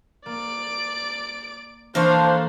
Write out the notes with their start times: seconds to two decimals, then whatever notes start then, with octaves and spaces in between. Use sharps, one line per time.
0.26 A#3 D5 D7
1.95 E3 A#3 D4 A4 C5 F5 C#6